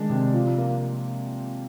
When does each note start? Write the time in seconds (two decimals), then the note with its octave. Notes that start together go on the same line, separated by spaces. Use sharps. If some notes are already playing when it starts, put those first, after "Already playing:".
Already playing: D#3 G#3 D4
0.09 C3
0.33 F3
0.58 A#3